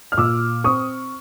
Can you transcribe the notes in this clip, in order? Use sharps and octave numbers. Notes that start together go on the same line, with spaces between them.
F6
A#2 D6 E6
C4 C#6 D#6